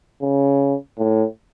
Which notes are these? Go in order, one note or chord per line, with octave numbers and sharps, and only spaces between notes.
C#3
A2